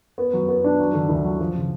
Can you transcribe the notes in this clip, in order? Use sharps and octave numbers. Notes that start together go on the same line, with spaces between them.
B3
F#3
B3
D4
F#3
D3
D2
F#3
F3
C#3